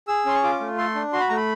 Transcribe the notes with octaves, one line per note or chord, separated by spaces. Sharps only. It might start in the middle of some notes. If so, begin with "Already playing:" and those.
G#4 E6
C#4 C6
C#6
F4 D6
A3
A4 C6
D4
F#4 C6
B5
A3 A#5
B5